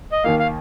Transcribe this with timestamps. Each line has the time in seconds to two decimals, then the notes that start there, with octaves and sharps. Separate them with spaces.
0.12 D#5
0.24 D#2 D#3 A#3 F5
0.39 F5